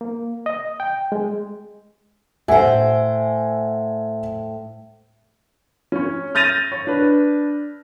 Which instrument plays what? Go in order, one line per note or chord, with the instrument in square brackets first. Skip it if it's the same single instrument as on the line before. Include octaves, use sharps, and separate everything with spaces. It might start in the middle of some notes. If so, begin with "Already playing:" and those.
[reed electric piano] A#3
D#5
G5
G#3
[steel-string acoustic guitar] A2 C5 [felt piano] E5 F#5 G#5
[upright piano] C#4 C#5
F6 G6 A6 A#6 D#7 F7
C#5
D4 B4